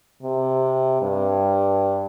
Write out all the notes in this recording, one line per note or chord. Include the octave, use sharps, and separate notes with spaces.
C3
G2